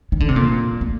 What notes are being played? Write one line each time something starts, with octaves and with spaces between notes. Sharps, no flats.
D#3
D3
C3
A#2
A3